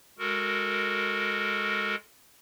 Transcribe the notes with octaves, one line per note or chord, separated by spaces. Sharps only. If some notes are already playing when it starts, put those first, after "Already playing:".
G#3 F#4 A4 A#4